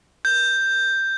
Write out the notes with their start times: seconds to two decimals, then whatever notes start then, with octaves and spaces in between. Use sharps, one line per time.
0.25 G6